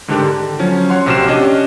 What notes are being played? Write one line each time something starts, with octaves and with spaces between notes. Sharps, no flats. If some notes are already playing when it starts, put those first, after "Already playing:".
G#2 D3 D#3 D4 G4
D3
F3 F#3 C#4
C#5 F#5 C6
A#1 C3 F#4 F6 C7 E7
C#4 D4 G4 D#5